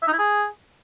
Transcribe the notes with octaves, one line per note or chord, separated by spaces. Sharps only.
E5
D#4
E4
G#4